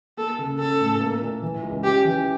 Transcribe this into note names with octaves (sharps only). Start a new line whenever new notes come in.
A#3 A4
C#3
C#4 A4
A2
A#3
A#2
E3
C#2
C#4 G4
E3